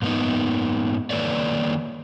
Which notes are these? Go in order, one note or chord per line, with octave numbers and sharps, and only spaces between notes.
G#2 A#3 B3 D#4
D#3 A#3 A4 B4 C#5 D5